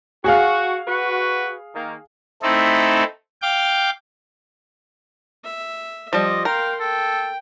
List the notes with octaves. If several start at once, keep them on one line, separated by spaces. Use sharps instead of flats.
F#4 G#4 F5
F#4 B4
D#3 A#3
A3 C4 D#4 E4 A4
F5 G5 D6
E5
F3 G3 D#5
A#4 F5 G5 C6
A4 G5